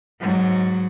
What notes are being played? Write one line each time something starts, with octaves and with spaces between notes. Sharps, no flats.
G#2 F#3